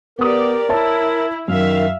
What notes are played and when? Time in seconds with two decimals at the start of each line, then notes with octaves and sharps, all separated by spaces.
0.19 B3 G4 A#4 D5 D#6
0.69 E4 C#5 E5 A5
1.48 F#2 D#3 E5 F5